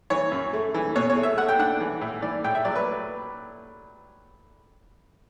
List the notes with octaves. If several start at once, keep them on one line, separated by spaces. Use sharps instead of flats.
E3 C#5
F#2
A3
E3
B2 C#5
C#5
A3
E5
A3 F#5
G5
D4 F#5
E3
A2
E3 D5
A2 G5
E5
F#3 D5
B4